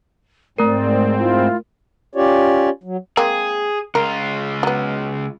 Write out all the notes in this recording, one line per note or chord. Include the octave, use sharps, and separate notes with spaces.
G#2 A3 C4 A#4 D5
E4 F4
C#4 F4 G4 C#5 D5
F#3
G#3 A#3 C4 G#4
C#2 F4 A#4
F#3 B3